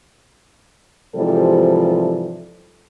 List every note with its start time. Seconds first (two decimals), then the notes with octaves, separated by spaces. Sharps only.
1.15 G#2 C3 E3 F3 G3 A4